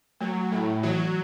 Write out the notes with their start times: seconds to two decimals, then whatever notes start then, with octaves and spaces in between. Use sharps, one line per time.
0.21 F#3 A3
0.52 A2 A3
0.83 E3 F#3